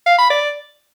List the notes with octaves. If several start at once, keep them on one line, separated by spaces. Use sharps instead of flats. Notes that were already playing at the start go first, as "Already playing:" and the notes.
F5
B5
D5